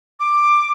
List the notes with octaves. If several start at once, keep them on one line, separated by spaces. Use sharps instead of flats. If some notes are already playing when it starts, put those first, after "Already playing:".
D6